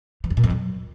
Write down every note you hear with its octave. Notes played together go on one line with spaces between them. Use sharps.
E3
F2
A#2
F2
F#3